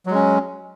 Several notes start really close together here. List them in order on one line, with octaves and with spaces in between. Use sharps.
F#3 G#3 C#4